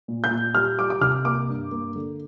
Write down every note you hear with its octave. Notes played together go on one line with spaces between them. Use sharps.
A#2
G6
A#2
G3 F6
G3 D6
D6
C2 F6
A#3 D6
G2
A#3
D3